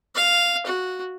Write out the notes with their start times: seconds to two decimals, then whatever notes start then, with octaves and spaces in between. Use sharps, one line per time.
0.15 F5
0.66 F#4